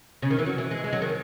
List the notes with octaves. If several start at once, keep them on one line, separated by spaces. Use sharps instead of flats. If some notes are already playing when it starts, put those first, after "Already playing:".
C#3
D#3
E3
F#3
E3
G#3
G#3
F#3
D#3